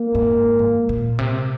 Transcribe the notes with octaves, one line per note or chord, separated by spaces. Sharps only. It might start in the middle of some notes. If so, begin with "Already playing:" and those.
Already playing: A#3
G#2
G#2
A#2
C3